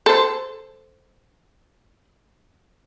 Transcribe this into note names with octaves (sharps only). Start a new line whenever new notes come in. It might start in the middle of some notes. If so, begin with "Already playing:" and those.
A4 C5